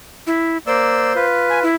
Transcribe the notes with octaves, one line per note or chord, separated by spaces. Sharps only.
E4
A#3 C5 D5 E6
F4 B4
G#5
E4